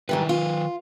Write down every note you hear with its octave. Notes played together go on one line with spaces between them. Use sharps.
G#2 D#3 E3 G3 B4
F4